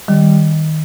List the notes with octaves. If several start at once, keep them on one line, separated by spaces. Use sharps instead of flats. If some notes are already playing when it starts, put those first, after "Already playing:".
D#3 G3